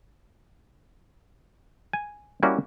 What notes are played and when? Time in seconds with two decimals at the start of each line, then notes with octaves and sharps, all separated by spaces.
1.93 G#5
2.43 G3 A#3 C#4 E4 F#4